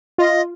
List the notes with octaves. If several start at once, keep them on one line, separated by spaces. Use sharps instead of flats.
F4 D#5